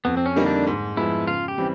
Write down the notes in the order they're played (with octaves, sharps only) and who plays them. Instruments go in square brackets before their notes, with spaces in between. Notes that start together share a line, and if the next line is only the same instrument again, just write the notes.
[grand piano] F2 [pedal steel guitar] B3
[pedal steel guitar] C4
C#4
[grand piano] D3 G3 A#3 D#4
[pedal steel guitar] D4
[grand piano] G#2
[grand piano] F3 G#3 B3 [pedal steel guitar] E4
[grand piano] C#3 [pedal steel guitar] F4
[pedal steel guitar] G4
[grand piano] E3 G3 C4